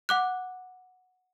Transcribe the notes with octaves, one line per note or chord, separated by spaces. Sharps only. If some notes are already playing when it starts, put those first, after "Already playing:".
F#5 D6 F#6